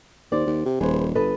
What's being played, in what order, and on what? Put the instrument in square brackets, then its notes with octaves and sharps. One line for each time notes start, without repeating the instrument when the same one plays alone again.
[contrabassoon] D#2 [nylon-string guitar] C5 D5
[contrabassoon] D#2
C3
[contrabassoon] D#1 [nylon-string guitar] G#4 B4 C5
[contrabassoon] G1 [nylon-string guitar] A4 B4 D#5